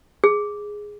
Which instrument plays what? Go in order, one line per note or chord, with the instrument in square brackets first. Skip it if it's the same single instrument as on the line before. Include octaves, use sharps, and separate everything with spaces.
[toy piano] G#4